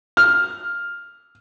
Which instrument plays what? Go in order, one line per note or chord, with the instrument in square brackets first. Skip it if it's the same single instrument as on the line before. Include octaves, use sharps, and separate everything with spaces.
[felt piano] F6